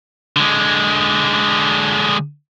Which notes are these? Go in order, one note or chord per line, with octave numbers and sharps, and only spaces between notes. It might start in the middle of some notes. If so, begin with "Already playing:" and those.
D3 G#3